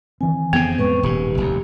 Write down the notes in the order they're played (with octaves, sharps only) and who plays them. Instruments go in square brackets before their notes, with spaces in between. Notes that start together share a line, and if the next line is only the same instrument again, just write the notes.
[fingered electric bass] D#3 E3 C4 [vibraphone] G#5
[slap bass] F2 C#3 [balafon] B3
[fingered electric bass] A2 G#3 [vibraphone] B4 C#6
[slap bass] D#1 G#2 [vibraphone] G4
[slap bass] F1 D#2